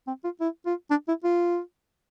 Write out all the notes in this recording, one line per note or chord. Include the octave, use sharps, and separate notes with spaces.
C4
F4
E4
F4
D4
E4
F4